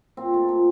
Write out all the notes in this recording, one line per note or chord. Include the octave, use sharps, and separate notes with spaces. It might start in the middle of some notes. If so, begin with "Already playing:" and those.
A#2 C4
A3
A#2